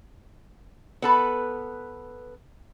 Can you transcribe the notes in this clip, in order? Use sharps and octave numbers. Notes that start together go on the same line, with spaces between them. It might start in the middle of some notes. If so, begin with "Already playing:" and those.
B3 A4 B4